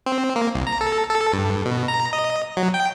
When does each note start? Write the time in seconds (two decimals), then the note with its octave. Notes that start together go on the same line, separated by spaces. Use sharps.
0.06 C4
0.36 A#3
0.55 C2
0.67 A#5
0.81 A4
1.09 A4
1.33 G2
1.65 B2
1.88 A#5
2.13 D#5
2.57 F#3
2.74 G5